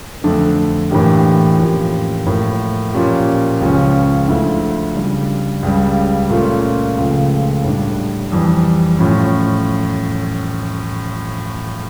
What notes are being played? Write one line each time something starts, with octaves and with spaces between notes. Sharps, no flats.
F2 D3 A3 D4
A2 E3 A#3 D4 G4
A2 F3 A#3 C#4 G4
A2 F3 A#3
A#2 F3 C#4 G4
C#2 C#3 F3 C#4
D2 D3 F3 A3 E4
C#3 G3 D4
C#2 C#3 G3
A#2 A3 C#4 F4
C#2 C#3 F3 A3
A2 G3 D4
F2 E3 G3
A2 F3 C#4